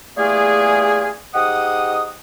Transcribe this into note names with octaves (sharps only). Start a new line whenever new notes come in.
E2 G3 A3 A#3 F4 G#4
G#2 G4 D#5 F#5 D#6